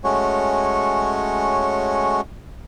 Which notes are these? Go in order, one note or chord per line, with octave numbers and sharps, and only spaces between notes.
G#3 A3 C#4 F#4 C#5